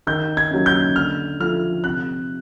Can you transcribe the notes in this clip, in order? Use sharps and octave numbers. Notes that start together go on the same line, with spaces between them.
D#3 G6
G#6
F#3 A#3 C#4
G6
D3 F6
F3 A3 F6
C3 F#6